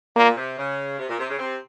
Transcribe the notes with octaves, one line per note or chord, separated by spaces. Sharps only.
A#2 A#3
C3
C#3
C3
A#2
C3
C#3
C3 C4